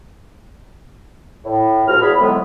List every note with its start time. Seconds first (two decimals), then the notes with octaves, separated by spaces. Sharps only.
1.45 A2
1.87 C#2 F3 F#4 F6
2.01 E2 F3 G#4 B5
2.19 F2 A2 D3 F#3 G#3 B3